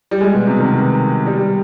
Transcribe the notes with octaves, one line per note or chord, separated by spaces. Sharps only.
G3
G#3
B2
C3
D#3
G3